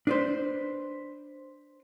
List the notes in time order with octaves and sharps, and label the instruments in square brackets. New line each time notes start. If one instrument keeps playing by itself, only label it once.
[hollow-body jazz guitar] D4 B4 C5